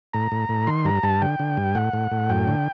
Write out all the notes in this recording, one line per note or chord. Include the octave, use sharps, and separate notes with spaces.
A2 A#5
A2
A2
D#3 C6
G2 A#5
G2 A5
D3 G5
D3
G2
A2 F#5
A2
A2
F#2 G5
D3